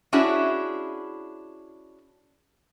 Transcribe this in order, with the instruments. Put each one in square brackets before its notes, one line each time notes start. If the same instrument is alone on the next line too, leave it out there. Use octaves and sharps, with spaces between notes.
[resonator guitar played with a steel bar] C#4 D4 E4 F#4 G#4